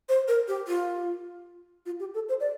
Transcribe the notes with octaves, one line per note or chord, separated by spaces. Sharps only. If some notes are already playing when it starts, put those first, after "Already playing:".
C5
A#4
G4
F4
F4
G4
A4
C5
D5